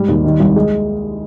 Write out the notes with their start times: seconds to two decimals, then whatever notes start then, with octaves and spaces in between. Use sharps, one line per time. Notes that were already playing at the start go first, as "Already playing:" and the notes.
Already playing: G#2 G3
0.08 D#2
0.24 D#3
0.40 C2
0.56 G#3